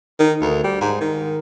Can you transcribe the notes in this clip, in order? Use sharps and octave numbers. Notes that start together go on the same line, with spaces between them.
D#3
D2
G3
G#2
D#3